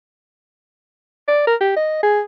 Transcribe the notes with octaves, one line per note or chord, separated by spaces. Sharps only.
D5
A#4
G4
D#5
G#4